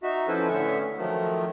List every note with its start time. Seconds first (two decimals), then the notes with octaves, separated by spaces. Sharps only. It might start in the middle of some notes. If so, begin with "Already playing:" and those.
0.03 D#4 F#4 E5
0.28 F3 C#4 E4 A4 B4 C5
0.48 A2 D3 B3 C#4 E5 C#6
0.97 D#3 F3 F#3 A3